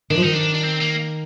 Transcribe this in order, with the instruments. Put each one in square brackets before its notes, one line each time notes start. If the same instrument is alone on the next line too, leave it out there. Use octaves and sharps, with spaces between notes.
[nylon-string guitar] D#3 [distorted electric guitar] D4
[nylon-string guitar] F3
[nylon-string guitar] D#3 [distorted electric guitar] D#4
[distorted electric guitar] D4
D4
C4
A#3